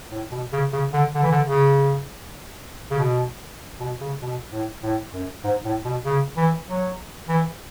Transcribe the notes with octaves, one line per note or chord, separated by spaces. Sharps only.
A2
B2
C#3
C#3
D3
D3
E3
D3
C#3
C#3
B2
B2
C#3
B2
A2
A2
F#2
G#2
A2
B2
C#3
E3
F#3
E3